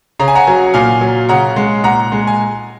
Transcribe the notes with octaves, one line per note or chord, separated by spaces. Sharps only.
C#3 A#5
G#5
F#5 A#5
F#3
A#2 F5 G#5
F#3
C#3 F#5 A#5
G#3
A#2 F#5 A#5
G#3
G#5